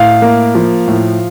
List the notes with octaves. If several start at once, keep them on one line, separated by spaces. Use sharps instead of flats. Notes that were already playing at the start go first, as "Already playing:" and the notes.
Already playing: A2 F5
A#3
F3
A2